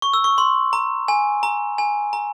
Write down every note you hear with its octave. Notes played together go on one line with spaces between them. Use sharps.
C#6
E6
C#6
C6
A#5
G#5
A#5
G#5
A#5